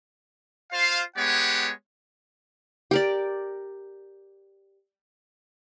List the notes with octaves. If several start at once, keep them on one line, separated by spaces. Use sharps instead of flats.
F4 C5 F5
G#3 B3 G4 C#5 F#5
G4 A#4 D5